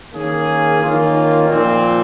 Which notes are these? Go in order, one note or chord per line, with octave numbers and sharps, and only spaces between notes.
D#3 A#3 C#4 G#4
D#3 A#3 C#4 F4
A#2 F3 C4